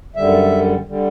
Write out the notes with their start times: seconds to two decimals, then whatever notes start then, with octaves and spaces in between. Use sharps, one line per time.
0.16 F#2 D3 G3 E5
0.88 D3 G3